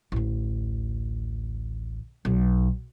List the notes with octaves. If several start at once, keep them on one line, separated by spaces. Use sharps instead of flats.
A1 D2
B1